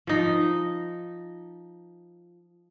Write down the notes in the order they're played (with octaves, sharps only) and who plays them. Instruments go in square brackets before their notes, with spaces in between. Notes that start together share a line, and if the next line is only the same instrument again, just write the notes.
[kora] F3 D#4